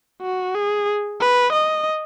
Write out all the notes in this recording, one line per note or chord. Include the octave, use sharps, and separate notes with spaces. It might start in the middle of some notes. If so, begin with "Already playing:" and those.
F#4
G#4
B4
D#5